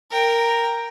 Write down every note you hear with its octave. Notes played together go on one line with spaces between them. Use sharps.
A#4 G5